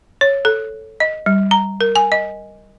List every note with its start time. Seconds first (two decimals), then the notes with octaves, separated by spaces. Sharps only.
0.21 C#5
0.45 A4
1.00 D#5
1.26 G3
1.51 A#5
1.81 A#4
1.96 G#5
2.12 D#5